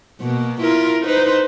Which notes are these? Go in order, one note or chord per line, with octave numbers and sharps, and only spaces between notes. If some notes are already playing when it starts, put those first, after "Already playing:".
B2 A#3
E4 F4 A#4
D#4 B4 C5